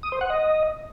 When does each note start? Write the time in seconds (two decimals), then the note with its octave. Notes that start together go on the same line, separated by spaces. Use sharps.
0.03 D#6
0.12 C5
0.21 F#5
0.30 D#5